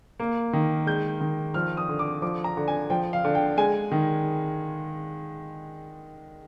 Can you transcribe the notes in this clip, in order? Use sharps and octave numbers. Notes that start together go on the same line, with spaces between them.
A#3
D#3
G#3 G6
D#3
F3 F6
D#6
D3
D6
F3 D6
A#5
D3
G#5
F3 G5
F5
D3
G5
G#3 G#5
D#3